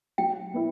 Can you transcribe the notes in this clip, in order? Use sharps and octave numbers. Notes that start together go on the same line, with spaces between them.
F#3 G5
B3 E4